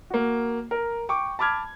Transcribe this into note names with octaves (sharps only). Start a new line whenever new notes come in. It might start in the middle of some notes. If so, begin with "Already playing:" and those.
A#3 F#4
A#4
G5 C#6 D6
A5 B5 D6 F6 G#6